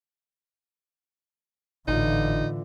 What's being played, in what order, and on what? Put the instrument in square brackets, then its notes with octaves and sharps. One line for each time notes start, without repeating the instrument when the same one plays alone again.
[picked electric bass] G#1 [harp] A2 F4 [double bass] D3 E3 [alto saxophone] D#4